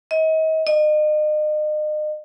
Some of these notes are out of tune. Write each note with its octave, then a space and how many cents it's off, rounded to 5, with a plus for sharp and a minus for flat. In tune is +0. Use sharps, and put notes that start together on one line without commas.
D#5 +35
D#5 -40